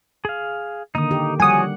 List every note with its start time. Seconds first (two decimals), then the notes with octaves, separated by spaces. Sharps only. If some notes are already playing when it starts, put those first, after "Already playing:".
0.25 G#4 F5
0.95 D3 D#3 A#3 D#4 D#6
1.11 G4
1.40 F3 G3 F#4 C#5 F#5 G#5 D#6